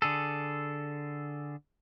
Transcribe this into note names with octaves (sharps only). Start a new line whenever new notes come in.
D3 G#4 A4